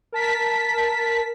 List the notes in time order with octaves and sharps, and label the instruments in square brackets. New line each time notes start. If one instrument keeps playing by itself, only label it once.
[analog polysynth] A#4 A5 B6